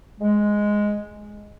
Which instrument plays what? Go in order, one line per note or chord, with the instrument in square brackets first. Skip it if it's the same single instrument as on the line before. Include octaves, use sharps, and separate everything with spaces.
[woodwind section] G#3